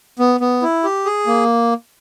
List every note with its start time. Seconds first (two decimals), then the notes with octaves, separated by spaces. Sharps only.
0.19 B3
0.40 B3
0.62 E4
0.84 G4
1.05 G#4
1.27 A#3